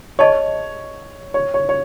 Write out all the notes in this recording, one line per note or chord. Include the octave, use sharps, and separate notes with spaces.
G#4 C#5 D#5 A5 C#6
C#5
C#5
C#5